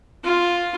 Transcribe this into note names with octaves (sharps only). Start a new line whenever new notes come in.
F4